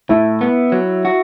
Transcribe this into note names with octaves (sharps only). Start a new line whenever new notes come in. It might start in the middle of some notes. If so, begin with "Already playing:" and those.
A2 E4
B3
F#3
F#4